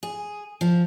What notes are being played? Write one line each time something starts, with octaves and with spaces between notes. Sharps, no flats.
G#4
F3